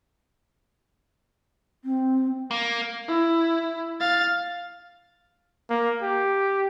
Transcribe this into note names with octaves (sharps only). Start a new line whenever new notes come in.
C4
A#3
E4
F5 A6
A#3
G4